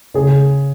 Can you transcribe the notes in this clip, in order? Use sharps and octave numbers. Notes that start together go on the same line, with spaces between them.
C#3 G#4